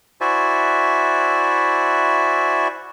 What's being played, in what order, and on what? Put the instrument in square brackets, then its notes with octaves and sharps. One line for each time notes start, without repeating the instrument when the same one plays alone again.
[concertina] E4 F#4 C5 D5 E5 G#5